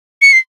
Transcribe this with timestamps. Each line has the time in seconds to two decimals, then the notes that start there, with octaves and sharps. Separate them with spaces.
0.22 C#7
0.33 C7